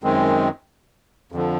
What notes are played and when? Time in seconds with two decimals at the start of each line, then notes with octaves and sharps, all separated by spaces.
0.03 F#2 D#3 G#3 C4
1.32 F2 D3 F3